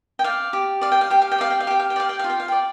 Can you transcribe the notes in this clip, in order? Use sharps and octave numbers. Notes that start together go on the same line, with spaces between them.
G5
D5 F5
G4
D5 F5
G5
F5
G4 G5
F5
G5
D5 F5
G5
F5
G4 G5
F5
G5
D5 F5
G5
F4 F5
G5
F5
D5 G5